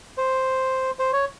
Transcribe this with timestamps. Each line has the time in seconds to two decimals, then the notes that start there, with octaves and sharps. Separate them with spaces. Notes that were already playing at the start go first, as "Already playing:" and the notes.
0.17 C5
0.99 C5
1.13 C#5